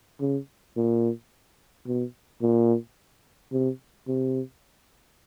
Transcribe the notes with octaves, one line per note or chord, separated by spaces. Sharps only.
C#3
A#2
B2
A#2
C3
C3